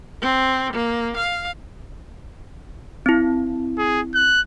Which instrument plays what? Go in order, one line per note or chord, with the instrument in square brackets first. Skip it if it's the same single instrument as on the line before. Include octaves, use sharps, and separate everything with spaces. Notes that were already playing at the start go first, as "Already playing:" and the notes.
[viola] C4
A#3
F5
[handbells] C4 E4
[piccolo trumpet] G#4
F#6